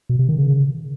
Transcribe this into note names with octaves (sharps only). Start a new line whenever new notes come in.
B2
C3
D#3
C#3